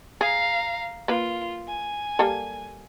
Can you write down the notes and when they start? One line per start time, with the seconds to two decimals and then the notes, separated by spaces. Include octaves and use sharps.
0.21 G#4 F5 A#5
1.08 A#3 F4 B4
1.67 G#5
2.19 G3 A#3 A4